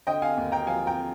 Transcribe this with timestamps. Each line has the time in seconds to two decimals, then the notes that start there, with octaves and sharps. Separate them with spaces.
0.07 D3 D#5 G5
0.22 F5 G#5
0.37 D#2
0.52 G5 A#5
0.66 F3 F5 G#5
0.87 G5 A#5